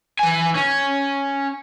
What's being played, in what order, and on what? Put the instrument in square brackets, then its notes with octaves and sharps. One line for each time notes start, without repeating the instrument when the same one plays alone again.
[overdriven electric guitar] E3 G#5
C#4